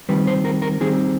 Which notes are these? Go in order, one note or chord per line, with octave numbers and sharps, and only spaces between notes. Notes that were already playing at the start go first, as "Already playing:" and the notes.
D#3 G3 C4 B4
C5
A#4
A#4
D#3 G3 C4 G#4